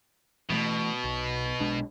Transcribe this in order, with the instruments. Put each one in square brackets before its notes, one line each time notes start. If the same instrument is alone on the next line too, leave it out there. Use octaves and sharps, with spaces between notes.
[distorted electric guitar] B2 [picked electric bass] E3 G3 A3
[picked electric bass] B1
B1 G#3 D4